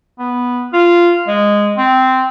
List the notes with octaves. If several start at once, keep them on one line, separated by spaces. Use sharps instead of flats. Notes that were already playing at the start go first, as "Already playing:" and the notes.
B3
F4
G#3
C4